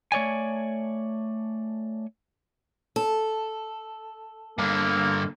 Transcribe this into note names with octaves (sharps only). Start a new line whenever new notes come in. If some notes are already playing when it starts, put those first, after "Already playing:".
A3 C#5 D5 G#5
A4
G2 D3 A#3